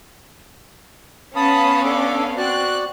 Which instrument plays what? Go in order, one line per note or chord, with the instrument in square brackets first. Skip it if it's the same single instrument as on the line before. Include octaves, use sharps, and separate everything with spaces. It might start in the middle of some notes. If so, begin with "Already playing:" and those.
[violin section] B3 C#4 F5 [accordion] A5 B5 D#6
[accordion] D4 A4 D6
[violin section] C4 F#6 [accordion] F#4 D5